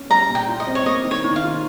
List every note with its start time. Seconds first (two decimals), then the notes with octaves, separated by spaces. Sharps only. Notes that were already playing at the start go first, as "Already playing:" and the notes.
Already playing: C#4
0.10 G3 A#5
0.29 A#2
0.35 G5
0.48 F4
0.60 D#5
0.67 C4
0.75 C#5
0.86 A#3 D#5
1.04 D#3
1.11 C#5
1.24 D#3
1.36 F5
1.43 F4